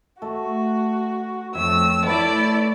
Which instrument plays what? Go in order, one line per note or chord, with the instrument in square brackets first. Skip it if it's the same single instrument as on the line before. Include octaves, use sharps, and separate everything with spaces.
[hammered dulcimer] A3 A4 [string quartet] F#4
[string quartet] F2 A3 E6 [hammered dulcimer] C#5 E5 G5
[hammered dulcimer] A3 B4 [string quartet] E4 A4 D5